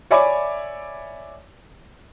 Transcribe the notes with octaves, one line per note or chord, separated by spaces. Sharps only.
C#5 D5 E5 G#5 B5 D6